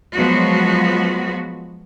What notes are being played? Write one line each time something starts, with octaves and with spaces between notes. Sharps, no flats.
F3 F#3 G#3 B3 F#4